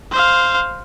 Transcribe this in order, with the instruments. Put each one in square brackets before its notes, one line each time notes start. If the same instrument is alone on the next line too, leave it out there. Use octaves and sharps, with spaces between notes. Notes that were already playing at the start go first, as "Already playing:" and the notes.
[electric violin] C5 F5